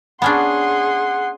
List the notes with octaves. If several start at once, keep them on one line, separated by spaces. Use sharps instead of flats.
B3 C#4 D4 G#4 F#5 C6